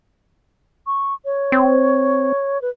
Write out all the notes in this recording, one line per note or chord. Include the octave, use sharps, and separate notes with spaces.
C#6
C#5
C4
B4